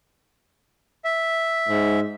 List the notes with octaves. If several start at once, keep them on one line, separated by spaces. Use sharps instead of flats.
E5
G#2